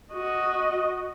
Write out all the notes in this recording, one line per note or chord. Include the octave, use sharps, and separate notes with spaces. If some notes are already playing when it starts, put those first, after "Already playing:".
F#4 D#5